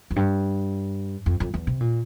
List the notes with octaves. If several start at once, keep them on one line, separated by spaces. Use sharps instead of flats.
F2
G2
F2
F2
E2
C3
A#2